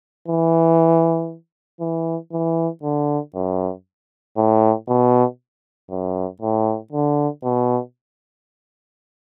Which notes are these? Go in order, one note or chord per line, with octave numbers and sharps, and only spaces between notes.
E3
E3
E3
D3
F#2
A2
B2
F#2
A2
D3
B2